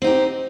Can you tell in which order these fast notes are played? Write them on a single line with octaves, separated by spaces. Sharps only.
C4 D#4 G4